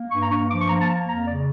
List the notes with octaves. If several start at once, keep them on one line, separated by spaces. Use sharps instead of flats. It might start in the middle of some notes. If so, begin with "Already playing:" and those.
Already playing: A#3
G2 C#6
A#5
G2 C#6
F3 D6
C#6
A#3 A#5
A5
A#3 A#5
F2 A#5
C#3 D5